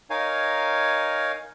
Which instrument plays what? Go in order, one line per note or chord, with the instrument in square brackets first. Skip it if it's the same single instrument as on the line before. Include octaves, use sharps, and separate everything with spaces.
[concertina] D#4 A#4 C#5 F5 G#5